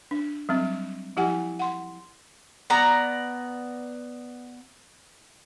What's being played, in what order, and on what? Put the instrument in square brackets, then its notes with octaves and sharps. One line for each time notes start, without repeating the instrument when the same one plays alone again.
[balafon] D4
F#3 G3 C4
F3 E4 G4 F#5 G#5
F#5 C6
[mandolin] B3 D5 A#5